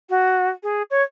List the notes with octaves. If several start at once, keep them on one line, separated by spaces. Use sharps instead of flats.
F#4
G#4
C#5